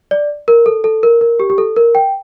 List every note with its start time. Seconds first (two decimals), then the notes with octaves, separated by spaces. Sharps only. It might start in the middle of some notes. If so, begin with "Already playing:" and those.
0.11 D5
0.48 A#4
0.66 A4
0.84 A4
1.03 A#4
1.21 A#4
1.40 G4
1.50 G4
1.58 A4
1.76 A#4
1.95 G5